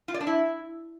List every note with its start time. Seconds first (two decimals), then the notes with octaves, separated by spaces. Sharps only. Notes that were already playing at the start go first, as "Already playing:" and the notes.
0.08 F4
0.14 D5
0.21 D4
0.27 E4